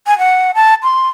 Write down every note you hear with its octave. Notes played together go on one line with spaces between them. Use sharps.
G#5
F#5
A5
C6